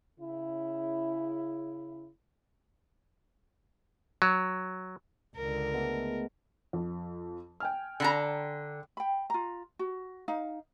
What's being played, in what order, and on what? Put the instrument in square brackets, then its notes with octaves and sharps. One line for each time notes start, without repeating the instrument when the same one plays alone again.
[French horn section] C#3 E4
[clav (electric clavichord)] F#3
[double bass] C#2 D3 [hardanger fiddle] A#4
[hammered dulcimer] G#3 A3 B3
[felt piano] F2
G5 G#5 F6
[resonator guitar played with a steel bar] D3 A5 A#5
[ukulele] G5 B5
F4 A#5
F#4
D#4 F5